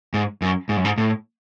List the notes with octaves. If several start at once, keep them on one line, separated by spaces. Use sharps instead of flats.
G#2
F#2
G#2
F#2
G#2
A2